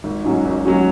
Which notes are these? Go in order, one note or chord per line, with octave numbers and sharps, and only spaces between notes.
G#1
G#2 F#3 C#4 F#4
G#1
F#3 C#4 F#4